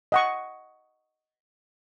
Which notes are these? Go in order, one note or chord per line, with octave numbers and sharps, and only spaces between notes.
D#5 F#5 C#6